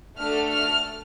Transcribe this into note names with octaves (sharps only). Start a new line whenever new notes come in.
A3 D4 F#4 A4 F6
F6